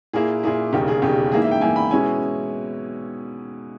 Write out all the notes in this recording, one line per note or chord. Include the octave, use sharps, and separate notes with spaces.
A#2 A#3 E4 G#4
A#2 A#3 E4 G#4
E1 D#2 C#3 G4
G#4
E1 D#2 C#3 G4
G#2 E3 A#3 E4 G#4
E5
G5
G#2 E3 A#3 E4 G#5
B5
B2 G#3 C#4 E4 G#5